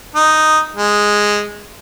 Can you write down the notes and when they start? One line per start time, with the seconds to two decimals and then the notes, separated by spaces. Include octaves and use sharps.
0.15 D#4
0.76 G#3